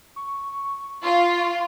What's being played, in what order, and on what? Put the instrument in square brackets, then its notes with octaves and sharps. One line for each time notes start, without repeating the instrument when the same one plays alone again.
[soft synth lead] C#6
[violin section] F4